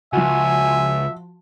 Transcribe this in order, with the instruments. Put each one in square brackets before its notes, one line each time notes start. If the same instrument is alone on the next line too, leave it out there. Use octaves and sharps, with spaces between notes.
[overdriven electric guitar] C#2 [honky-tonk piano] F3 F#4 [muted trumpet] E5 [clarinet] G#5